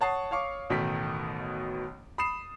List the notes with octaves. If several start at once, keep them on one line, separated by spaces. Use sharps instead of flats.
C#5 F#5 A5 C#6 D#6 C7
C#5 F5 C#6 D6
A1 B2 D#3 A3 B6
B5 D#6 C7 E7